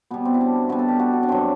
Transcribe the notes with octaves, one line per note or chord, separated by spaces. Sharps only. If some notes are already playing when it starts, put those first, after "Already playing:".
B2 G3 B3
C4
E4
D4
B2 G3 F#4
A4
G4
F#4
F#4
D4
G2 F#3 C4